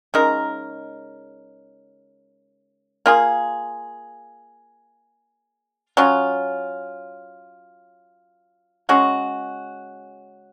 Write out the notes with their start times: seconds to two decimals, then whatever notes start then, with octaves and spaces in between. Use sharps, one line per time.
0.14 C#3 G#3 D#4 A#4
3.06 A#3 F4 G#4
5.97 F#3 C#4 F4
8.89 C#3 G#3 C#4 F#4